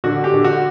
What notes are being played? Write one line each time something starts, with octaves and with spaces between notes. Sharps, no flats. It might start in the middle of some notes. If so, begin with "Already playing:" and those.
D3 F#4
G4
D3
F#4